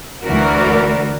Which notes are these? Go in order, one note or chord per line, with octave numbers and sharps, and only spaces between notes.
D2 E3 A3 F#4 A#4 D5